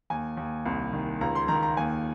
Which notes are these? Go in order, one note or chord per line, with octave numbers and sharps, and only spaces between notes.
D#2 G#5
D#2
C2
D#3
C#2 A#5
C6
D#3 A#5
A#5
D#2 G#5